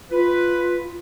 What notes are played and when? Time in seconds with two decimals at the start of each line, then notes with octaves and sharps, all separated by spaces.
0.11 F4 B4